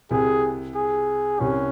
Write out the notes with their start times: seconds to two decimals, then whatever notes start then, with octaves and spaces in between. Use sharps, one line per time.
0.11 C2 C3 G#4
0.75 G#4
1.40 C2 C3 C#4